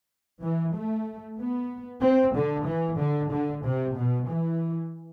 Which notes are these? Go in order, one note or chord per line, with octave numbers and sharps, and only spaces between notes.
E3
A3
B3
C4
D3
E3
D3
D3
C3
B2
E3